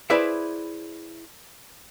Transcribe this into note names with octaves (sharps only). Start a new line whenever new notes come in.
E4 G#4 B4 C5 D5 E5